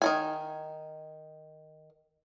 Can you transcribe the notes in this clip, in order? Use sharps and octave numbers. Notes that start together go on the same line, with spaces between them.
D#3 F#3 G#5